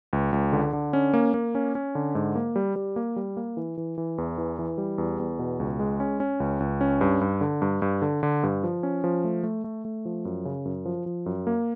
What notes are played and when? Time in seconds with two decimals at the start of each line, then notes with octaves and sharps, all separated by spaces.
0.13 C#2
0.33 C#2
0.52 D3
0.73 D3
0.93 C#4
1.14 A#3
1.34 A#3
1.55 C#4
1.75 C#4
1.95 D3
2.15 G#2
2.35 A#3
2.56 G3
2.76 G3
2.96 A#3
3.16 G3
3.37 A#3
3.57 E3
3.77 E3
3.98 E3
4.18 E2
4.38 E3
4.59 E3
4.78 G3
4.98 E2
5.19 E2
5.39 B2
5.60 C#2
5.79 G#3
6.00 C#4
6.20 C#4
6.40 C#2
6.60 C#2
6.81 C#4
7.01 G2
7.21 G2
7.41 D3
7.62 G2
7.82 G2
8.02 D3
8.23 D3
8.43 G2
8.63 F3
8.83 C#4
9.04 F3
9.24 A3
9.43 A3
9.64 A3
9.85 A3
10.05 F3
10.25 F#2
10.45 C#3
10.65 F#2
10.85 F3
11.06 F3
11.26 F#2
11.47 A#3